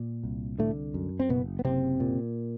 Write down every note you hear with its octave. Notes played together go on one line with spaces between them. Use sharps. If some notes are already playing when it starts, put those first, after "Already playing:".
Already playing: A#2
C2
A2 D3 A3
F#2
C4
F#1 B2 B3
B3
F#1 C3 C4
A#2